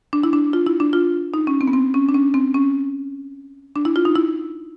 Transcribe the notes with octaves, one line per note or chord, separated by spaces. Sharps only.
D4
E4
D4
F4
E4
D4
F4
D#4
C#4
C4
B3
C4
C#4
D4
C#4
C4
C#4
D4
E4
F4
D#4
E4